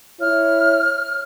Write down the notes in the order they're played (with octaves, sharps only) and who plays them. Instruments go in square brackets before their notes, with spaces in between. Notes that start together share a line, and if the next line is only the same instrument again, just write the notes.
[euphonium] E4 [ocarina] C#5 [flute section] F6